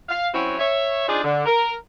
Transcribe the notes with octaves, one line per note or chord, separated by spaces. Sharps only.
F5
F#3 C4 C#4 E4 F#4 C#5
C#5 E5
D4 D#4 F4 G#4 C5 D5
D3
A#4